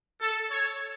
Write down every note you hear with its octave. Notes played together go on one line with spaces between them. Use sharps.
A4
C#5